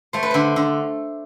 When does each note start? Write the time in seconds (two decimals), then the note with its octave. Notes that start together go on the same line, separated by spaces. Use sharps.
0.13 A3 C5
0.23 B4
0.31 D3 C5
0.56 D3